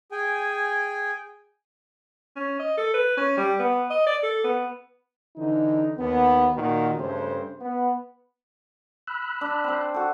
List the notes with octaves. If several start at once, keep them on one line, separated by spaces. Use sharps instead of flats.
G#4 G5 G#5
C#4
D#5
A4
B4
C#4
G3
B3
D#5
D5
A4
B3
D3 E3 D#4
D#2 B3
A#2 D#3 F#4
G2 C#3 A3 C5
B3
B5 E6 F#6
D4
C4 C5
F#4 A4